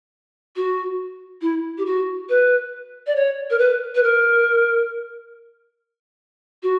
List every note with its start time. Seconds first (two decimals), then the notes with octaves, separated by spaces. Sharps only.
0.56 F#4
1.42 E4
1.78 G4
1.86 F#4
2.29 B4
3.07 D5
3.16 C#5
3.50 A#4
3.59 B4
3.95 B4
4.03 A#4
6.63 F#4